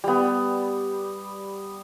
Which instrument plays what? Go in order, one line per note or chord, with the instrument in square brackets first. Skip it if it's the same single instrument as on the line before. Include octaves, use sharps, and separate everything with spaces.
[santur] G3 B3